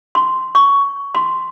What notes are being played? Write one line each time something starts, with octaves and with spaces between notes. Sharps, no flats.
C6
C#6
C6